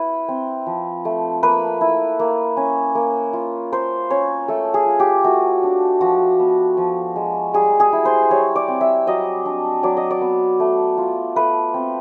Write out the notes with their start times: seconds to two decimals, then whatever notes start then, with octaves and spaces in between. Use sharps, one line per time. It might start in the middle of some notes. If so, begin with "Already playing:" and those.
Already playing: E4 B4
0.28 C4
0.67 F3
1.05 A3
1.43 A#3 B4
1.81 E4
2.19 A#3
2.57 C#4
2.95 A#3
3.33 F4
3.72 A#3 C5
4.10 C#4 C#5
4.48 A3 A4
4.74 G#4
4.86 F4
5.00 G4
5.24 A3 F#4
5.63 D4
6.01 F3 F#4
6.39 B3
6.77 F3
7.16 G#3
7.53 G3 G#4
7.80 G#4
7.93 E4
8.05 C5
8.31 G3 C#5
8.56 D5
8.68 C4
8.81 E5
9.07 F#3 D#5
9.46 D4
9.83 F#3 D5
9.97 D#5
10.11 D5
10.21 B3
10.60 A3
10.98 F4
11.36 A3 B4
11.74 C4